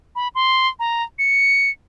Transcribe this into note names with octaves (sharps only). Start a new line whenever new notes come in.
B5
C6
A#5
C#7